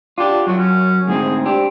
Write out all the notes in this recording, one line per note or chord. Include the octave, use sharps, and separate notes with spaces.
D4 F4 G4
F#2 F#3 F#4
C#4
D2 G#2 C4 G#4
C4 D4 G4